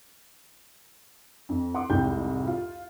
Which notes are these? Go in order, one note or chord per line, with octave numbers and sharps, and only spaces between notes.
F2
F#5 C6 D6
C2 F2 G#2 G#3 G5 G6
F4